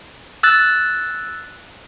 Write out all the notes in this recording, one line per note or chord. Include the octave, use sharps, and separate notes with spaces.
E6 F#6 A6